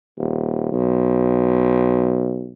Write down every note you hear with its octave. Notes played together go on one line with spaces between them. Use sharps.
D#1
B1